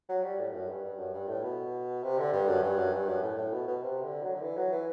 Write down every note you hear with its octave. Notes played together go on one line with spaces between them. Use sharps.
F#3
G3
A2
F#2
G2
G2
F#2
G2
A2
B2
C3
D3
G2
F#2
G2
F#2
G2
F#2
A2
A2
B2
B2
C3
D3
F#3
D3
E3
F#3
E3